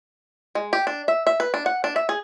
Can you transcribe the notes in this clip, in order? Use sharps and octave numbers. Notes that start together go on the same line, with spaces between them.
G#3
G4
D4
E5
E5
B4
D4
F#5
D4
E5
G#4